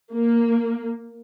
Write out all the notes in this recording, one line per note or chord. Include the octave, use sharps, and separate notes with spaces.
A#3